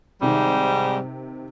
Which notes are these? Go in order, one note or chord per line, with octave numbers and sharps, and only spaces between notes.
G#2 C3 D#3 G3